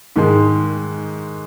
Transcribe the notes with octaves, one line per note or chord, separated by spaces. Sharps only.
G#2 D#3 G#3